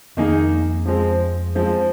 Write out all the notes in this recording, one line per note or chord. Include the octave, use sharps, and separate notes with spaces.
F2 D#3 A#3 D#4 G#4
F3 G#3 C4
F3 G#3 C4